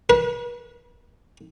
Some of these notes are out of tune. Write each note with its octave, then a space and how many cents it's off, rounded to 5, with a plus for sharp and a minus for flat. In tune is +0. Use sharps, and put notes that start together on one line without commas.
B4 -45